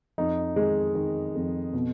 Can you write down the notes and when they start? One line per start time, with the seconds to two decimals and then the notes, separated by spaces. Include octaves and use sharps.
0.18 F2 D#4
0.56 D#3 G#3
0.95 D#3
1.35 F2
1.73 B2